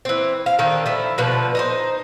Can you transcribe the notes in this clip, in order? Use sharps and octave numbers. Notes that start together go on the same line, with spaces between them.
E3 C4
F5
D3 D#3 C4 A4
F3 E4
B2 D3 F3 B4
D#4 G4 C5